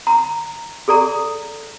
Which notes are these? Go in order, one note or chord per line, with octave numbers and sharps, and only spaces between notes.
A#5
G#4 A4 D5 A#5